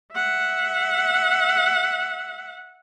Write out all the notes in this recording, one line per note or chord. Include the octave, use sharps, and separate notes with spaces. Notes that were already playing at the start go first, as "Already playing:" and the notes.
E5 F#5